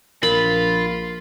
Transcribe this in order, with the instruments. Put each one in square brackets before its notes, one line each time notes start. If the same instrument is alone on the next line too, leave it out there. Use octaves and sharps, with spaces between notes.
[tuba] A#1 [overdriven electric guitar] F4 [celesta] A#4 [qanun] B5